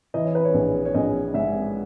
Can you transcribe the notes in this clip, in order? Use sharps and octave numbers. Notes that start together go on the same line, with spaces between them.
E3 D#5
C#5
B4
C#5
A#1
C#5
A#1 D#5
G#2 E5